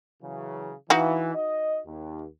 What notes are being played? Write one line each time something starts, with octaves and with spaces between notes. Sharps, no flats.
C#3 E3 F#3
E3 D#4 F#4 F5
D#5
D#2